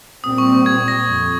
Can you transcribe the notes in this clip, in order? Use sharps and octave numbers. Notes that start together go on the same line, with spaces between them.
A#2 G3 C4 D#6
C#6
G#6
A#6
F2